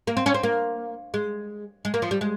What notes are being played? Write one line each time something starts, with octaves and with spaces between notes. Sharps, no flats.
A#3
C4
C#4
C4
A#3
G#3
G#3
A#3
F3
G3
G#3